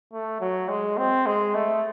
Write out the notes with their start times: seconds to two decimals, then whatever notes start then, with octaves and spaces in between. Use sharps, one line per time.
0.13 A3
0.41 F#3
0.69 G#3
0.98 C4
1.26 G#3
1.54 A3